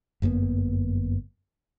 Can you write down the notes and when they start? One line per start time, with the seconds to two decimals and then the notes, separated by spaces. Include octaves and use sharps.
0.22 G1 F#2 A#3 B3